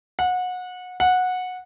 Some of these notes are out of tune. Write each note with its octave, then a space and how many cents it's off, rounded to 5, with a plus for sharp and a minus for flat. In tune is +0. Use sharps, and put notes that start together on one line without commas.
F#5 -25
F#5 -15